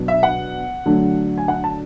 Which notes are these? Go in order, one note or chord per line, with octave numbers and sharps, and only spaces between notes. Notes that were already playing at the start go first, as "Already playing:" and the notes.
Already playing: B2 F#3 B3 D4
E5
F#5
D3 F#3 A3 D4
G#5
F#5
A5